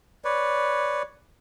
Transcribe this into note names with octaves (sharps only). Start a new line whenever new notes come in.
B4 C#5 D5